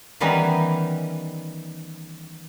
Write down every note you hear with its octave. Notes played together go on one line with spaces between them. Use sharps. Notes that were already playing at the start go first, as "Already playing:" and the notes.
D#3 E3 G3 B3 C#4 D#4